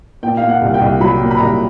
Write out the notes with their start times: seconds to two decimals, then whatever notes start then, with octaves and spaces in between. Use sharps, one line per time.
0.23 A#2 G5
0.37 F5
0.43 A#2
0.49 F#5
0.61 C2
0.74 G5
0.81 C2
1.00 F#3 B5
1.20 A#2
1.31 B5
1.39 C2 A#5